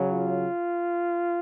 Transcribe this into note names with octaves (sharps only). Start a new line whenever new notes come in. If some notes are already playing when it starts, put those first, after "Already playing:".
Already playing: C#3 F#3
F4